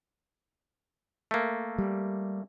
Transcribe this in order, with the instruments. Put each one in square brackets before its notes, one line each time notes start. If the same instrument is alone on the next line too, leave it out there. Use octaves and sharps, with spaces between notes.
[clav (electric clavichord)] A3 A#3
[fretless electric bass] G3